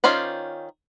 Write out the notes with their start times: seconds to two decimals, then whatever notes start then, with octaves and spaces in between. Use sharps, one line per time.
0.04 D#3 C#4 F4 C5 D5